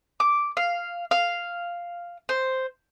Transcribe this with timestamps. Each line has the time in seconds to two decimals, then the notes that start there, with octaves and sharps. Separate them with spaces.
0.20 D6
0.57 F5
1.11 F5
2.29 C5